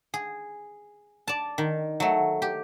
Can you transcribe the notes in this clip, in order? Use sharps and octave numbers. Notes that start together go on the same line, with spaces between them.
G#4
D5 A5
D#3
F#3 A3
G4